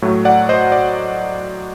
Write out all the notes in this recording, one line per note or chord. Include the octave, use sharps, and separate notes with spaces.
A2 F#3 A3
D5 F#5
C5 D#5
D5